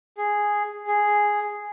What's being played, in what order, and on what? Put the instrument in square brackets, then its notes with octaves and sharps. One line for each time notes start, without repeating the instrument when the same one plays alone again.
[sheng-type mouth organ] G#4
G#4